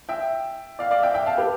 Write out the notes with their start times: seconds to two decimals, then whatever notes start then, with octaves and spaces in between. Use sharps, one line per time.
0.09 E5 G5
0.79 D5 F5
0.91 D5 F5
1.03 E5 G5
1.14 E5 G5
1.26 F5 A5
1.38 G4 B4